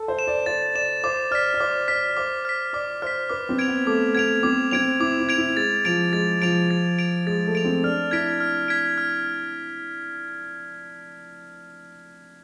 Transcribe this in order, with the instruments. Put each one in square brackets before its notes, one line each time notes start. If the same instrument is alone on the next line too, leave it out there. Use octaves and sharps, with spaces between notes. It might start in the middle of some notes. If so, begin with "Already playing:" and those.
Already playing: [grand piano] A4
C5
[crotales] E7
[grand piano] D5
[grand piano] C5 [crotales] A6
[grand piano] D5 [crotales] E7
[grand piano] C5 [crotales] D6
[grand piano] D5 [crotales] F6 B6
[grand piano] D5
[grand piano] C5 [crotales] D6
[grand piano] D5 [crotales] F6 B6
[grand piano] C5 [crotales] D6
[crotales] F6 B6
[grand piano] D5 [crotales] D6
[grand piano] C5 [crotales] F6 B6
[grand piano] B4 [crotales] D6
[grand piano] C4
[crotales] G#6 D7 F7
[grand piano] B3
[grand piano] A3 [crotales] D6
[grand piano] B3 [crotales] G#6 D7 F7
[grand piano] C4 [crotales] D6
[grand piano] C4 [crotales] G#6 D7 F7
[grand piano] E4 [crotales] D6
[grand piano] E4
[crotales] G#6 D7 F7
[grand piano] E4
[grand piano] G#3 [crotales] A6
[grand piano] F3 [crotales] D7 F7
[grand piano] G#3 [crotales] A6
[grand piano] F3 [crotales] D7 F7
[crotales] A6
D7 F7
[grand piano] G#3 [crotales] A6
[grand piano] A3
[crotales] D7 F7
[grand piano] C4
[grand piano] D4 [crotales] F6
[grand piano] E4 [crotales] G#6 B6 D7
[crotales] F6
G#6 B6 D7
F6